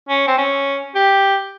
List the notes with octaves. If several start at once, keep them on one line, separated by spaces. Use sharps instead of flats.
C#4
C4
C#4
G4